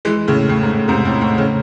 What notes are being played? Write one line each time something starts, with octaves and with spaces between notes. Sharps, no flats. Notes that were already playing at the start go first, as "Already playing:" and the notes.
E3 G#3
A2 C#3
A2
G#2
A2
G#2 C3
A2
A2
A2 C#3